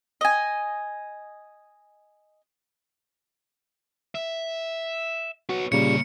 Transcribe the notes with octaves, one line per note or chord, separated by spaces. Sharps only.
D#5 G#5
E5
B3 F#4 C#5
A#2 C#3 G3 A#3 C#5 C#7